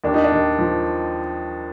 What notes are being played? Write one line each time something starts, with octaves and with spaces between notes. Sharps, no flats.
D#2 D4
D#4
D4
D#2
F3